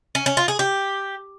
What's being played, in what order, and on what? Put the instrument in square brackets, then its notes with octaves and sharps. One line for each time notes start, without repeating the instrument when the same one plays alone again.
[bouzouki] C#4
C#4
F4
G#4
G4